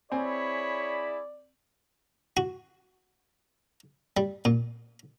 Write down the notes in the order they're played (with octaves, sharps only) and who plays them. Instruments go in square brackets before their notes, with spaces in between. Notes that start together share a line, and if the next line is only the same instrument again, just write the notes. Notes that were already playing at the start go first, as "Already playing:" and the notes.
[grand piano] C4 G#5 [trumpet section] E4 G#4 B5 [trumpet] C#5 [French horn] D5
[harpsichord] F#4
G3
A#2